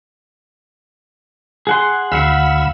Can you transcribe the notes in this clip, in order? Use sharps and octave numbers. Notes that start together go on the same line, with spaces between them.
G#4 F#5 C6
D2 F5 F#5 B5 E6